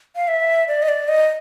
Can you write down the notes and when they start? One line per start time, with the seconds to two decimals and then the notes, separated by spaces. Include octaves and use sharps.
0.16 F5
0.28 E5
0.68 D5
0.82 D#5
0.88 D5
1.08 D#5